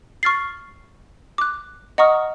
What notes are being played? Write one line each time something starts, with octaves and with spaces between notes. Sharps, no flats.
C#6 F6 A6 C7
D6 F#6
D#5 F#5 A#5 C#6 D#6 F6